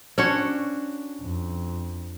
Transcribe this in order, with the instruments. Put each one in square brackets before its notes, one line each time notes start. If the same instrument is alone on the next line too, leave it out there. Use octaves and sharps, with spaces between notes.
[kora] C#4 C#5 [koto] D4 F#4 F#5
[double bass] F2